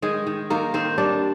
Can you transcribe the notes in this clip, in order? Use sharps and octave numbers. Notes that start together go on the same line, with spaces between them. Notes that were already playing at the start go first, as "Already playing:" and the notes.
D#3 G#3 G#4
D#3
D#3 A#3 A#4
D#3 C4 C5
G3 D4 D5